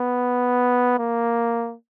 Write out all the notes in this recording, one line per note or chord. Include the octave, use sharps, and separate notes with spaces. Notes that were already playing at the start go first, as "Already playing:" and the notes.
Already playing: B3
A#3